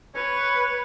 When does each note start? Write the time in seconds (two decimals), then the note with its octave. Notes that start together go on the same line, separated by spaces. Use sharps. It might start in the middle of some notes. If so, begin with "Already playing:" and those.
0.15 B4 C#5